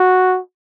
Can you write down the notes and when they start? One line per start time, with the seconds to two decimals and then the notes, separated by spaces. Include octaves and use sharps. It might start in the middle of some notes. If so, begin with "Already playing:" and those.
Already playing: F#4